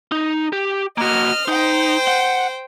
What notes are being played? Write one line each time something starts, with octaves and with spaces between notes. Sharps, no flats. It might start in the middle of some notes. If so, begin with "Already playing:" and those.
D#4
G4
A#3 F#4 D#5 F6
D#4 C5 G5
F#5